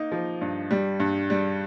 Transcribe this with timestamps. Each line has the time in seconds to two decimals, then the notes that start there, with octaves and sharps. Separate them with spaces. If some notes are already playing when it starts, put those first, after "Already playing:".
Already playing: A#3 D#4
0.12 F3
0.41 G2
0.71 G3
1.00 G2
1.30 G3